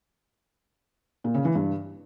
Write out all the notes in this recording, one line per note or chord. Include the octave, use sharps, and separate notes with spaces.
A#2
C#3
E3
G2